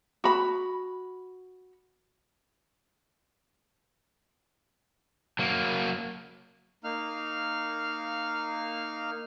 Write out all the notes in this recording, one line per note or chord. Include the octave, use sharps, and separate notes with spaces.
F#4 B5
F#3 A#3
A#3 D#4 F5 F6